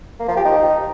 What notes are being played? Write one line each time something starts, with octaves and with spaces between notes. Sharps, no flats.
A#3
F3
G4
D#4